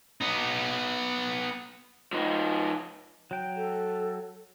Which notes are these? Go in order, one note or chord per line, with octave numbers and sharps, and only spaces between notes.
B3 D#4
F3 D#4
F#3 G5
A4